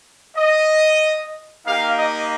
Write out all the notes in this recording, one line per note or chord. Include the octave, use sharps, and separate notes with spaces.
D#5
A#3 D#4 G4 F5
D#5